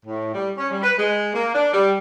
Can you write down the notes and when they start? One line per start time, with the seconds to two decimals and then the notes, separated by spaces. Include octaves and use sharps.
0.05 A2
0.34 G3
0.58 C#4
0.71 G3
0.83 B4
0.98 G#3
1.34 A#3
1.55 D4
1.73 G3